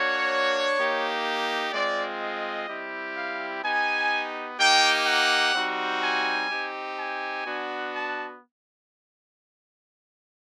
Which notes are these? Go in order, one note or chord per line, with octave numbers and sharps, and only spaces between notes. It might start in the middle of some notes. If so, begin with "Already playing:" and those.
Already playing: A#3 D4 F#4 C#5
A#3 D#4 G4
G#3 C4 F4 D5
D#5
G3 C4 E4 G4
F5
B3 D#4 G4 G#5
A#3 D#4 G4 G5
F#5
G3 C4 D#4 F#4
G#5
C4 D#4 G4
G#5
B3 D4 F#4
A5